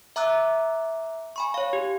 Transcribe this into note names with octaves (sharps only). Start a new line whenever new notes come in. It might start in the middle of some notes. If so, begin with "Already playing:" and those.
E5 A#5 D6 E6 F#6
G#5 B5 C#6
C#5 F5
G4